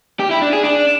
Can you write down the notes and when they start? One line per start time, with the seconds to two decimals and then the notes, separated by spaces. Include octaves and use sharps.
0.20 G4
0.31 E4
0.42 D4
0.53 G#4
0.64 D4